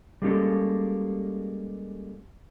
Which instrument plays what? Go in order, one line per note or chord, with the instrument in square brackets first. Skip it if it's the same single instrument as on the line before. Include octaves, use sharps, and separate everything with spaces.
[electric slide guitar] G3 G#3 A#3 C#4 G4 A4